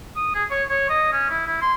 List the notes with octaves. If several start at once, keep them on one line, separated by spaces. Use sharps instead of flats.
D#6
G#4
C#5
C#5
D#5
C#4
E4
E4
C6